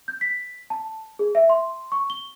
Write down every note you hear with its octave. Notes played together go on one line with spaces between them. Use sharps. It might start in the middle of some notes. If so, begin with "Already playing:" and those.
G6
B6
A5
G#4
E5
C6
C#6
G7